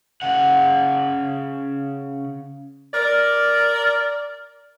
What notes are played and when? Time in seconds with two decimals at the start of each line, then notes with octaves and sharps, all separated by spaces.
0.22 C#3 F#5
2.94 A#4 D5